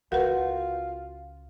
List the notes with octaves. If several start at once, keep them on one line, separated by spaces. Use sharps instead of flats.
C#2 F4 F#4 A#4 B4